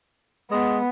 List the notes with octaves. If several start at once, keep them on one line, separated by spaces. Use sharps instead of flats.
G#3 B3